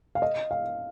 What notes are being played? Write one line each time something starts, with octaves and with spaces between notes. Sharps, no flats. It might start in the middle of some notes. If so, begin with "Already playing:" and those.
F5
D#5
F5